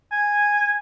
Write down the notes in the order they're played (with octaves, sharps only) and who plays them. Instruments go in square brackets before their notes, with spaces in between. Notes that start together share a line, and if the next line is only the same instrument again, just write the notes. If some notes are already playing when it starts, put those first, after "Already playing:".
[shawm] G#5